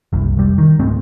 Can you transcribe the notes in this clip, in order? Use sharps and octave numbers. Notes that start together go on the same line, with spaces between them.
F#1 C2
F1 G3
D#3
C#2 G#2 A3 C4